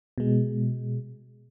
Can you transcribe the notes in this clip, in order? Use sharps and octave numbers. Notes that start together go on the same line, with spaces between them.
B2 G#3